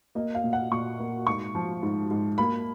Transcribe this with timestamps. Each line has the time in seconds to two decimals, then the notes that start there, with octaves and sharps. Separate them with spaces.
0.15 A#3 D#5
0.35 F5
0.44 A#2
0.53 F#5
0.71 A#2 C#6
0.99 A#3
1.27 G#2 C#6
1.55 F3
1.83 G#2
2.11 G#2
2.38 A#3 B5